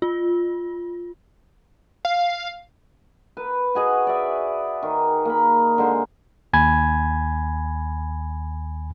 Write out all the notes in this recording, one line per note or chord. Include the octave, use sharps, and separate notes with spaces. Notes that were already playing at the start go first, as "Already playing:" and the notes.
F4
F5
B4
F#4 G#4 D#5
D5 E5
D#3
A#3 B5
D3 G#3 C5
D#2 G#5 B5 G#6